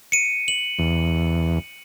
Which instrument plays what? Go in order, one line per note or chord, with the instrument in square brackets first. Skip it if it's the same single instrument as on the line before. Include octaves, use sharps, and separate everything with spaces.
[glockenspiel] C#7 D#7
F#7
[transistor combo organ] E2